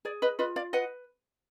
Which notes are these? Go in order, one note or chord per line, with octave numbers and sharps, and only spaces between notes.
G#4 D5
B4 D#5
F4 B4 D#5
D5 F5
B4 D#5 F#5